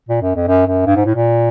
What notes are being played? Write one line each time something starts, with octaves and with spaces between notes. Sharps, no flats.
A#2
F#2
F2
F#2
F#2
G2
G#2
A2
A#2